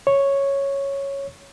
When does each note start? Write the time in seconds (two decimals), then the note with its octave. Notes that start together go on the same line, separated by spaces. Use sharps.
0.07 C#5